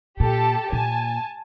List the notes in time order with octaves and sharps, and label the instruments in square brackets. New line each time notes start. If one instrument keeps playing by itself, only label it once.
[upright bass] A#2 [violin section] G4 A4 A5
[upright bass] A#2 [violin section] G#5 A5